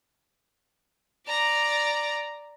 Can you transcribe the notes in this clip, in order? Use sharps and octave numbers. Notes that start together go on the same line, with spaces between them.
D5 A#5